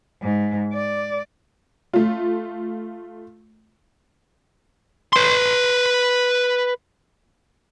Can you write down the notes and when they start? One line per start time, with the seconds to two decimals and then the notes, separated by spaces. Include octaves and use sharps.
0.22 G#2
0.73 D5
1.93 A3 F4
5.13 B4 C6